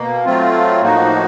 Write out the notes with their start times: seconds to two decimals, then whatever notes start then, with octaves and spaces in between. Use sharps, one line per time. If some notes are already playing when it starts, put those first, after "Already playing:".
Already playing: B2 A#3
0.25 F#3 A3 C4 F4
0.81 A2 F3 A#3 D#4 F#4